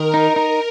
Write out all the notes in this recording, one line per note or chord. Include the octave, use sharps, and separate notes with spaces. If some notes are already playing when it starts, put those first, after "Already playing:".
Already playing: D#3 A#4
D#4 A#4
D#4